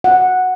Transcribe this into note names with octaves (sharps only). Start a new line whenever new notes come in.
F#5